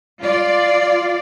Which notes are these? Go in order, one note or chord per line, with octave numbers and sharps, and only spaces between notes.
F4 D5